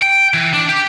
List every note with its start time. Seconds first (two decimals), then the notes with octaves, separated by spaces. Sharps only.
0.02 G5
0.34 E3
0.53 D4
0.69 G4